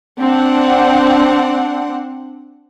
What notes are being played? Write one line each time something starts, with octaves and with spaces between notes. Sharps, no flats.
C4 D4 F#5